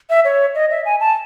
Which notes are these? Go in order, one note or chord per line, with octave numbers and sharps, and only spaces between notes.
E5
C#5
D#5
E5
G#5
A5